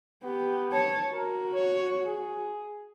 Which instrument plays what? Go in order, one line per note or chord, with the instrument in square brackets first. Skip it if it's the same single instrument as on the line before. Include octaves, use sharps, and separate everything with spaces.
[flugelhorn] B3 [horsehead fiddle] G4
[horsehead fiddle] C#5 A5
[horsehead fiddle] F#4 [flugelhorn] A#4
[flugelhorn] C#5
G#4